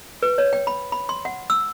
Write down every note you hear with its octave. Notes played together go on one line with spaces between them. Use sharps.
B4
C#5
G5
B5
B5
C6
F#5
E6